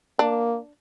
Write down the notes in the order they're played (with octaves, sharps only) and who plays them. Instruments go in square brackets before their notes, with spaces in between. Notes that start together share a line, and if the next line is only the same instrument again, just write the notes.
[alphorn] A#3 [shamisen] D4